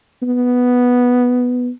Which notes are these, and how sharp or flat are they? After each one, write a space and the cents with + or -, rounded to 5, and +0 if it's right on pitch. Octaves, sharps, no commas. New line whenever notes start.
B3 +0